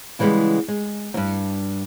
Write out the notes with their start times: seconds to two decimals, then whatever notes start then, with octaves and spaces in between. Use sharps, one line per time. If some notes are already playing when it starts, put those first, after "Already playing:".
0.19 C#3 E3 G3 G#3 B3
0.68 G#3
1.14 E2 G2